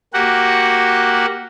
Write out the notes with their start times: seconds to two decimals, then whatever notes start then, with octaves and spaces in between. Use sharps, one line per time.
0.14 A#3 F#4 G4 F#5